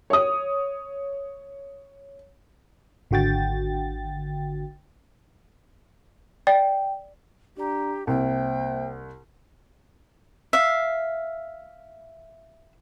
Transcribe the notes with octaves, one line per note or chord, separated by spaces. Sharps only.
C#5 D#6
G#1 D3 F#4 G5 A6
D5 G5
D4 G4 D5 A#5
C2 A#3 C5 E5 G5
E5 F5